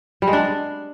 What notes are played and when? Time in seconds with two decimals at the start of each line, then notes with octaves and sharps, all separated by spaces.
0.22 G3
0.27 G#3
0.33 D4